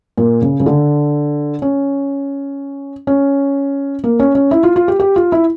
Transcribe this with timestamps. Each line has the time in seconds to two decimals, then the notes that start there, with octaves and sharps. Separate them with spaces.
0.18 A#2
0.42 C#3
0.60 C#3
0.66 D3
1.62 C#4
3.07 C#4
4.04 A#3
4.20 C#4
4.35 C#4
4.51 E4
4.63 F4
4.76 F4
4.88 G4
5.00 G4
5.16 F4
5.32 E4